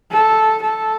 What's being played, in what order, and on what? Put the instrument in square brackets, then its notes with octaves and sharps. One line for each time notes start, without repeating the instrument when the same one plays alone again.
[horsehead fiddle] A4
A4